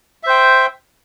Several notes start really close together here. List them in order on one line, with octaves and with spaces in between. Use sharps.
E5 C5 G5